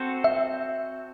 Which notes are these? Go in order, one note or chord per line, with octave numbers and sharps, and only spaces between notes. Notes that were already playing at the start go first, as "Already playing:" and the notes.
Already playing: C4 F#4 A4 C5
E5